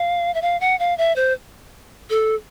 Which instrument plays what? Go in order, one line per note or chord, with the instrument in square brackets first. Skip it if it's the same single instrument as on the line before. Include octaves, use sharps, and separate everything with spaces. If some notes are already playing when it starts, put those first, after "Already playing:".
Already playing: [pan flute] F5
E5
F5
F#5
F5
E5
C5
A4